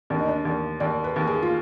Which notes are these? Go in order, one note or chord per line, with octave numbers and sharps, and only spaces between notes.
D#2 D4
D#4
D4
D#2
D#2 D5
B4
D#2
G#4
F4